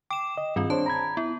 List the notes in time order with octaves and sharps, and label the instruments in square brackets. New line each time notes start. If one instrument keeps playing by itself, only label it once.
[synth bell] G5 E7 [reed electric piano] D6
[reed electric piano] D#5
[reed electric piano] G2 [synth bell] D#3 C4 F4
[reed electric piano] D4 C5 C#5 [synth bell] A5
[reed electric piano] A#5 B5 G#6
[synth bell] B3 [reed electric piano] E4